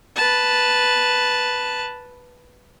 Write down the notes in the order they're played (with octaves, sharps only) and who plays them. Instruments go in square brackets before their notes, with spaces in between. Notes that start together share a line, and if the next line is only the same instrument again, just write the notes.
[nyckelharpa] B4 A5